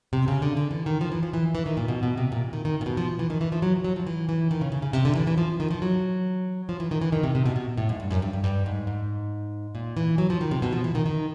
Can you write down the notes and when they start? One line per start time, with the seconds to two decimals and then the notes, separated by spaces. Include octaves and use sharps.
0.13 C3
0.28 C#3
0.42 D3
0.57 D3
0.71 E3
0.86 D#3
1.01 F3
1.12 E3
1.23 F3
1.33 E3
1.55 E3
1.66 D#3
1.77 A#2
1.88 B2
2.03 B2
2.18 C3
2.32 A#2
2.53 D#3
2.65 D#3
2.81 A#2
2.86 B2
2.97 F3
3.19 E3
3.30 D#3
3.41 E3
3.52 F3
3.62 F#3
3.84 F#3
3.96 F3
4.07 E3
4.29 E3
4.51 D#3
4.61 C#3
4.72 C#3
4.82 C#3
4.93 C3
5.05 D3
5.16 E3
5.27 E3
5.38 F3
5.60 D#3
5.71 F3
5.82 F#3
6.69 F3
6.80 E3
6.91 D#3
7.01 E3
7.12 D#3
7.23 C3
7.35 C3
7.46 B2
7.56 B2
7.77 A2
7.89 G#2
8.00 G2
8.11 F#2
8.22 G2
8.33 G2
8.44 G2
8.66 G#2
8.87 G#2
9.75 A#2
9.97 E3
10.18 F#3
10.30 F3
10.41 D#3
10.51 C3
10.62 B2
10.73 F3
10.84 E3
10.95 D#3
11.06 D#3